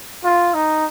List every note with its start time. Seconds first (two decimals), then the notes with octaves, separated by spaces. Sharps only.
0.24 F4
0.54 D#4